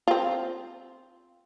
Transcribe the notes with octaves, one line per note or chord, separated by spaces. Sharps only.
C4 F4